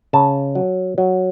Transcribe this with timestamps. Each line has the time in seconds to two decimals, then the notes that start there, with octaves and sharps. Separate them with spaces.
0.13 C#3 A5
0.55 F#3
0.98 F#3